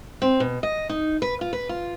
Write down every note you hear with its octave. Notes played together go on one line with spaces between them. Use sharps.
C4
B2
D#5
D#4
B4
F4
B4
F4